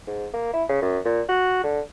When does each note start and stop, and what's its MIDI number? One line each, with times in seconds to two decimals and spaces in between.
0.07 0.26 44
0.34 0.52 58
0.53 0.64 64
0.69 0.79 49
0.82 0.99 42
1.05 1.21 46
1.29 1.62 66
1.64 1.80 50